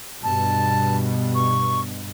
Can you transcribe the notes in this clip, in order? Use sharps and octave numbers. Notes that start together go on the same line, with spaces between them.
G2 B2 A5
C#6